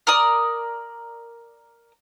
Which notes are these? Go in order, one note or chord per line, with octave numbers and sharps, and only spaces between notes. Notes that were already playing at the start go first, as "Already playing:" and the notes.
A#4 D5 D#6